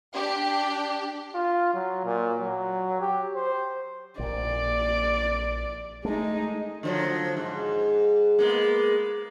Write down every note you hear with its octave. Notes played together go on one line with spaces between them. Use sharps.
D4 G4
F4
F#3
A#2
F#3
G4
C5
A#1 A#2 D5
G#3 A3 D#4
D3 F3 F#3
G#2
G#3 A#3 B3